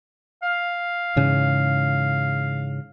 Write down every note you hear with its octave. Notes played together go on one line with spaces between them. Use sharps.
F5
G#2 C#3 E3